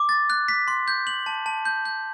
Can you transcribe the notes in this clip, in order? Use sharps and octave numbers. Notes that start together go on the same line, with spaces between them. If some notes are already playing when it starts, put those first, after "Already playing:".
Already playing: D6
A6
F#6
B6
C6
G6
F#7
A5
A5
G6
G6